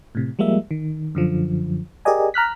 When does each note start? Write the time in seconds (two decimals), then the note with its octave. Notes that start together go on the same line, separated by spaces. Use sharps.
0.15 A2 C3
0.39 F3 G3 G#3 A#3 E5
0.71 D#3
1.15 F#2 D3 F3
2.05 G4 G#4 A#4 D5 D#5 G#5
2.34 A#5 F6 F#6 B6